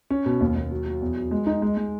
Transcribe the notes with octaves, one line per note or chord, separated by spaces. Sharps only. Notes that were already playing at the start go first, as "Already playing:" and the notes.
C#4
B2
D#2
D#2
F#3
F#3
E2
F#3
G#3
D#4
G#3
G#3